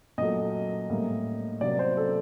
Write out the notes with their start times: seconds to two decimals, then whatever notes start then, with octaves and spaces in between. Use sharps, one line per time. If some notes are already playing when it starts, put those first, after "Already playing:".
0.18 A#2 F#3 A3 D#5
0.90 A2 G3 A#3
1.61 C3 F#3 A#3 D5
1.79 C5
1.97 A4